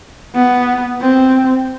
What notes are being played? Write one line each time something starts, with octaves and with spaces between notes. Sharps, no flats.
B3
C4